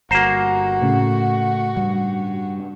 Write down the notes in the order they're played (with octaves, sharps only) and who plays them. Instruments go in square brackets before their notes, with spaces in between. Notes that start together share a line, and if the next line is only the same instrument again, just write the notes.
[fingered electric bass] G1 [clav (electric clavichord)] A#3 C5 [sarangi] F#4 [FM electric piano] A#5
[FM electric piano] A2 C#3 [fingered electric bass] A3
[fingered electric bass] G2 G3